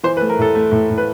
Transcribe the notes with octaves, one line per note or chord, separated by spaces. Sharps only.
E3 C5
B4
A3
A#4
A2 A4
A3
A2
A2
B4